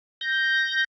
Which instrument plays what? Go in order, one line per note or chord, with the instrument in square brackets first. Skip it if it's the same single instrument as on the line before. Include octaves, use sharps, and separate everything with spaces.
[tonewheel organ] G6 A#6